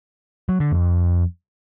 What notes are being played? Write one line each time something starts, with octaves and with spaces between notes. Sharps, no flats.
F#3
D3
F2